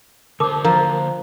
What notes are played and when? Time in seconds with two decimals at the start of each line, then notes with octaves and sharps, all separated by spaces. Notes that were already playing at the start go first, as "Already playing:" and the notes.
0.40 D3 A#4 C5 A5 D6
0.65 F3 A#4 A#5